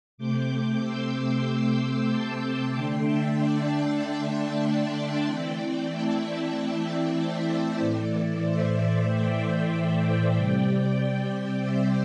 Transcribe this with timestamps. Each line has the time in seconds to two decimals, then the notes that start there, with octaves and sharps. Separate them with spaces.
0.18 C3 A3 C4 D6 G6
0.81 C6 E6
1.44 C6 E6
2.08 A5 D6
2.72 D3 A3 D4 G5 C6
3.04 E5 A5
3.36 D5 G5
4.62 E5 A5
4.94 E5 A5
5.25 E3 A3 C4 E4 D5 G5
5.89 E5 A5
6.53 D5 G5
7.17 C5 E5
7.48 D5
7.80 A2 E3 A3 D5
8.43 C5 E5
9.06 D5 G5
10.34 C3 G3 C4
11.60 C5 E5